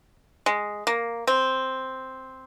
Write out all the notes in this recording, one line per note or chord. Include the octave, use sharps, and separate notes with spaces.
G#3
A#3
C4